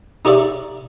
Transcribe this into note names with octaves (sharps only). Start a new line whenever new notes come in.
D#4 G4 G#4 C#5 D5 E5